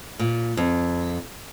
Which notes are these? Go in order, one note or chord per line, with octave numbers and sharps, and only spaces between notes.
A#2
F2